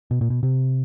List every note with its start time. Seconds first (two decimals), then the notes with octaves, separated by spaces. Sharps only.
0.11 B2
0.21 A#2
0.30 B2
0.43 C3